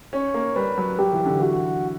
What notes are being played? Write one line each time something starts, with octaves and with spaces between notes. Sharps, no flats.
C#4 C#5
A#3
G3 B4
F#3
F#3 G4
E3
D3
E3 F#4